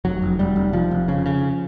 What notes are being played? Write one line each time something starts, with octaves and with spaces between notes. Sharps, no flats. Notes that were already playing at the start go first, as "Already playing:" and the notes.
F1 F#3
F1
F1 G3
F1
F1 F3
F1
C#3
C#3